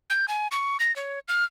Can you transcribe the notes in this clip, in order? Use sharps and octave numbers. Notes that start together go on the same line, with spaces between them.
G6
G#5
C#6
A#6
C#5
F6